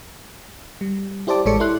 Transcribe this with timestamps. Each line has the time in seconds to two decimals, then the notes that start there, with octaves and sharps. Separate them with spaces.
0.81 G3
1.27 E4 G4 C5 D5 A5 D6
1.45 A1 G#3 A4 C#5 D5 C#7
1.60 E4 A4 C6 F#6